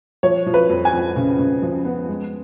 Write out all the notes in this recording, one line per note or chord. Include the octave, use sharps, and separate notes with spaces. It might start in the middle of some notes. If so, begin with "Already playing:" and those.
F3 C#5
F3
B4
F2
G#5
F2
C#3
C#3
F3
B3
G#3